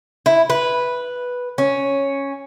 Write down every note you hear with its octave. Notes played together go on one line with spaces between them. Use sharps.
E4
B4
C#4